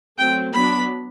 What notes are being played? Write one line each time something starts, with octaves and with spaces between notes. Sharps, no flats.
F#3 A3 C4 G5
F#3 B3 D4 B5